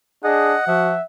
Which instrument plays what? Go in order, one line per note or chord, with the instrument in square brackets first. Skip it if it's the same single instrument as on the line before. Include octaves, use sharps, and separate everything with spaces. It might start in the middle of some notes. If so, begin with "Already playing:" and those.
[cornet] D4 [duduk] G#4 [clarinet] D#5 [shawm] F#5
[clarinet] F3 [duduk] F#4 [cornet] E5